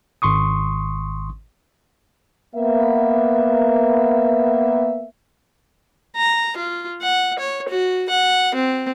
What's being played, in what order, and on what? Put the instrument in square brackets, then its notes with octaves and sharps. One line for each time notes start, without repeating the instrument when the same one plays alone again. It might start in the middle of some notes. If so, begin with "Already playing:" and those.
[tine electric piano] G#1 C6 C#6 D#6
[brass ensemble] A#3 B3 E5
[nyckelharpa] A#5
F4
F#5
C#5
F#4
F#5
C4